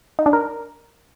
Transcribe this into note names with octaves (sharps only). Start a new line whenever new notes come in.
D#4
D4
A#4